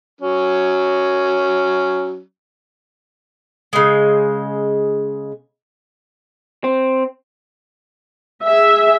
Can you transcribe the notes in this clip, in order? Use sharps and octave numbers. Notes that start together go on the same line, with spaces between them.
F#3 C#4
C#3 G#3
C4
G#4 E5